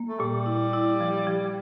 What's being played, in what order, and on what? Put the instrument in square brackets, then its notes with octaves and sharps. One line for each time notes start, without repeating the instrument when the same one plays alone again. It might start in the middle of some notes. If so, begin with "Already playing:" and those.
Already playing: [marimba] A#3
[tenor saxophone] A3
[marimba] A#2 [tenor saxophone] G3
[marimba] E4
E4
F3
F3